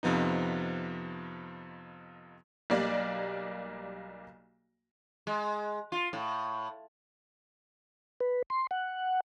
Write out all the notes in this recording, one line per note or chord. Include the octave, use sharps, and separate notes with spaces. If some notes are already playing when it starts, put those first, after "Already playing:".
F2 C3 F3 B3 D#4
B1 G3 A#3 D5
G#3
F4
A2
B4
C6
F#5